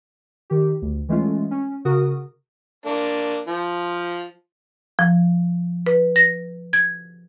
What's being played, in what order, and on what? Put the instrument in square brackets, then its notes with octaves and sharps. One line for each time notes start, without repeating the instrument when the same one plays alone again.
[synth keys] D#3 G4
D2
E3 G#3 A3 C#4 F4
C#4
C#3 F#4 A#4 D#6
[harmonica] A#3 D4
F3
[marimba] F3
B4
A#6
G#6